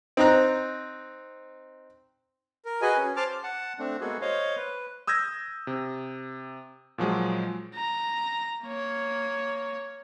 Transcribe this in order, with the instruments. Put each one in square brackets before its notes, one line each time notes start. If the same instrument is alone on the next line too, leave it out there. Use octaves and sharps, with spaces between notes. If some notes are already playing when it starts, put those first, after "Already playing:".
[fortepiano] C4 D#4 A#5 F#6
[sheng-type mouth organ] A#4
F#4 G#4 B4 D#5 G#5
C#4
C5 A5 D6 F6
[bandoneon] F#5 A5
A3 C4 D4
G#3 A#3 B3 F#4 G#4 A4
C5 C#5 D#5 F5
B4
[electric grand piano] D#6 E6 G6 G#6 A#6
C3
A#2 F3 F#3 G#3
[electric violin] A#5
A#3 C#5